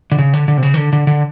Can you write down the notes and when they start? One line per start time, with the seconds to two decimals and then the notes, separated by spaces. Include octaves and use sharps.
0.12 D3
0.18 C#3
0.33 D3
0.48 D3
0.58 C3
0.63 C#3
0.74 D#3
0.77 D3
0.93 D3
1.07 D3